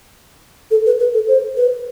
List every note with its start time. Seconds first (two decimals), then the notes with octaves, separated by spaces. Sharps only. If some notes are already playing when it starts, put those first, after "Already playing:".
0.71 A4
0.86 B4
1.00 B4
1.14 A4
1.28 C5
1.57 B4